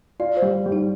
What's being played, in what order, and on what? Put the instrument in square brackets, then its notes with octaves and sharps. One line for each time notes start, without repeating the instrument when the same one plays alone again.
[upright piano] F4 [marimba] D5
[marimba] C5
[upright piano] G3
G3
[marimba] D#4